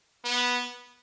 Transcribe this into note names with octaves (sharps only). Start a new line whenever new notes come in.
B3